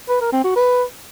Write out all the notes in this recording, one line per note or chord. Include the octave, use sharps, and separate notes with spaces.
B4
A#4
C4
F#4
B4